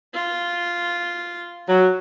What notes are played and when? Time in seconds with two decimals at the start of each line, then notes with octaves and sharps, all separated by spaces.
0.14 F4
1.66 F#3